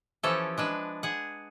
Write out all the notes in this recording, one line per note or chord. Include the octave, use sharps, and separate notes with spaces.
E3 F3 C#4 G4 A4
G#3 D4 B4
G#4 F#5